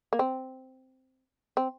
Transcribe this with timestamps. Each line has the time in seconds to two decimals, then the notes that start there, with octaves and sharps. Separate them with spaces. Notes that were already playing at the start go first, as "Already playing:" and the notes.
0.13 A#3
0.19 C4
1.57 C4